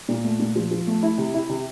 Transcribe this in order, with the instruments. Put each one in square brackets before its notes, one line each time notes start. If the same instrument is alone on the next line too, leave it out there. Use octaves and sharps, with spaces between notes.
[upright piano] A#2
A3
A#2
F3
F3
A3
E4
C3
E4
C3